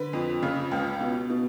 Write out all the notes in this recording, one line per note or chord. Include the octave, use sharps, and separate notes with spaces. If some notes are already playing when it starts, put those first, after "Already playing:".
Already playing: D3 B4
F2
C#3
C#2
B2
B2